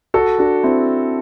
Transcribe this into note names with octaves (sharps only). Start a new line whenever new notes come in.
F#4 A4
D4 F#4
C4 E4